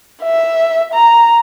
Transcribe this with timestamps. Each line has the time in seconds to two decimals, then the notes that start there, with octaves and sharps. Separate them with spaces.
0.23 E5
0.93 A#5